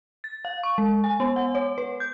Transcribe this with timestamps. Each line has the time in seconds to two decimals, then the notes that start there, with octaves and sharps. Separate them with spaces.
0.24 A6
0.45 F5
0.63 C#6
0.78 G#3
1.04 G#5
1.20 B3
1.36 F#5
1.55 C#5
1.78 B4
2.00 G6